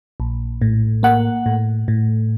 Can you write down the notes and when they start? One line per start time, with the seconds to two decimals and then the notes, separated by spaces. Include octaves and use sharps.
0.20 A#1
0.62 A2
1.03 A#3 F#5
1.46 A2
1.88 A2